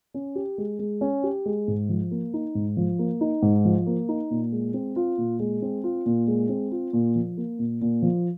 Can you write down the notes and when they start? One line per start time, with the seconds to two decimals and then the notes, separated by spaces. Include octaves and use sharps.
0.14 C#4
0.35 G4
0.58 G#3
0.79 G#3
1.01 C#4
1.23 G4
1.46 G#3
1.68 G#2
1.89 F3
2.11 A#3
2.34 D#4
2.55 G#2
2.77 F3
2.99 A#3
3.21 D#4
3.42 G#2
3.65 F3
3.87 A#3
4.09 D#4
4.31 A#2
4.52 G#3
4.74 C4
4.96 F4
5.18 A#2
5.40 G#3
5.62 C4
5.84 F4
6.06 A#2
6.28 G#3
6.49 C4
6.71 F4
6.93 A#2
7.16 F3
7.38 A#3
7.59 A#2
7.82 A#2
8.02 F3